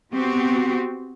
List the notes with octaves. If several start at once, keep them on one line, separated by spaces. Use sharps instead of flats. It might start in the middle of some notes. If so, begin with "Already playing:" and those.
B3 C4 F#4 G4